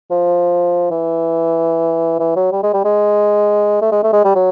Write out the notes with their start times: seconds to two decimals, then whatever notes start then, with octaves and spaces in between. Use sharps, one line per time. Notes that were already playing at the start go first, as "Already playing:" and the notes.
0.11 F3
0.91 E3
2.20 E3
2.36 F#3
2.52 G3
2.63 G#3
2.74 G3
2.85 G#3
3.82 A3
3.92 G#3
4.04 A3
4.13 G#3
4.25 G3
4.35 F#3